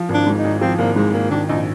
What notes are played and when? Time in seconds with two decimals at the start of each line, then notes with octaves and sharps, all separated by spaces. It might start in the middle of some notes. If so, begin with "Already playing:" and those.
Already playing: F3
0.09 G#1
0.14 D4
0.27 G#2
0.38 D#4
0.44 G#1
0.61 F3 C4
0.78 G#1 A#3
0.96 G#2 G#3
1.13 G#1 A#3
1.31 D#3 D4
1.49 A#1 D#4